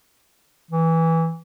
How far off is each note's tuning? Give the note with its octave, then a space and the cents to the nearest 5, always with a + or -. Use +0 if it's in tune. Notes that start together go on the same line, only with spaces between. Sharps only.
E3 -10